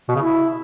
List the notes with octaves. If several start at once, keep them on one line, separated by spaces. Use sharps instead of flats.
B2
C#3
E4